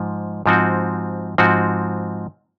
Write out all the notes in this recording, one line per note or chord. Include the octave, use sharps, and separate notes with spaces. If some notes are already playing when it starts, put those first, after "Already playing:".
Already playing: G#2 F3
G#2 F3 C4 F#4
G#2 F3 C4 F#4